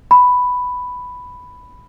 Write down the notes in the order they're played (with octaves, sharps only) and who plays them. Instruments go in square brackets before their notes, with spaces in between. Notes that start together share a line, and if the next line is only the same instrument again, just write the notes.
[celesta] B5